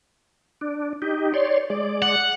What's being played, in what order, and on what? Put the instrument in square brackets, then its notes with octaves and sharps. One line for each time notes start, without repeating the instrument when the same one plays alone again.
[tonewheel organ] D4
D#4 G4
C#5 D5 C6
G#3 D5
[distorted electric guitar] F#5